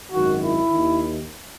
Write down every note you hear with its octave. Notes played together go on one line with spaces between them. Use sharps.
G#1 F#2 D#3 F#4
E4
D#2 D#3